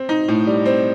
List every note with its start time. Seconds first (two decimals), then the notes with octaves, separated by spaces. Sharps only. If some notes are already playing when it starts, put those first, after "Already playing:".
Already playing: C4
0.09 D#4
0.28 A2
0.47 G3
0.66 C4